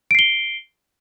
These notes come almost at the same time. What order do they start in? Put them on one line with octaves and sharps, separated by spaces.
D7 C7 G7